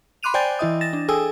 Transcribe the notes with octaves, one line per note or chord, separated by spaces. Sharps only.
B5 C6 D6 F#6 D#7 F7
C5 D5 G5 G#5 G6 A6
E3 E4 D#5 D#6
A6 A#6 E7
D4
G#4 A4 G5 G#5 D#6 E6